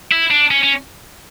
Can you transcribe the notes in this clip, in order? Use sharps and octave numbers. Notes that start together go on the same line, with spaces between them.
E4
D4
C#4
C#4